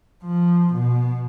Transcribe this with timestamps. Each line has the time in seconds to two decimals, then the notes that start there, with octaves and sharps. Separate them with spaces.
0.24 F3
0.73 B2